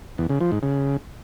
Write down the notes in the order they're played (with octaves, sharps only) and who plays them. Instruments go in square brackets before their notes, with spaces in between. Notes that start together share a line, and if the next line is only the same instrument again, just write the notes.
[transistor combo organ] E2
C#3
F3
G#2
C#3